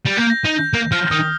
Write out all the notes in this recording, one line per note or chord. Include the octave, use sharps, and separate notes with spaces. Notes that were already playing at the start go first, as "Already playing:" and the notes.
G3
A#3 G6
A#6
D#4 A#6
G6
A#3
F3 F6
D#3 D#6